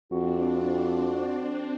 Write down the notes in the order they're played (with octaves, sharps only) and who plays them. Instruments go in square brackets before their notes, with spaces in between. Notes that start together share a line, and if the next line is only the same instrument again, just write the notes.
[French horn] F2 [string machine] C4 D4 [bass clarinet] F#4